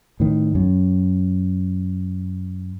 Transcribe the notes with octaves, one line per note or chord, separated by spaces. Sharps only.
A2 D#3
F#2